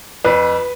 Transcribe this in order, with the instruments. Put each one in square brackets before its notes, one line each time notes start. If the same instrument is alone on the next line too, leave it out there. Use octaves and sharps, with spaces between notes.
[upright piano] F2 B4